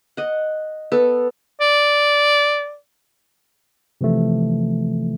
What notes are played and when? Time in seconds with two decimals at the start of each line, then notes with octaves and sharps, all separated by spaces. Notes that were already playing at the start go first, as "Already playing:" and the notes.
0.17 D#5 F#5
0.92 B3 A4
1.61 D5
4.01 C3 E3 F3 A3